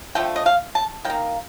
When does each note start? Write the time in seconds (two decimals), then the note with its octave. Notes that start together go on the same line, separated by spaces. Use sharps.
0.15 D3 F3 A3 G5
0.36 D#5
0.46 F5
0.75 A5
1.05 D#3 G5
1.10 A#3